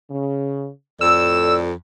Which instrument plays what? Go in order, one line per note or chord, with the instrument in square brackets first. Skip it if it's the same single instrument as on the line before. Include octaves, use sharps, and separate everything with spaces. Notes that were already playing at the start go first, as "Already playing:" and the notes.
[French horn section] C#3
[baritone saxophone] F2 [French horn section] A2 A4 D5 [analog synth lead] E6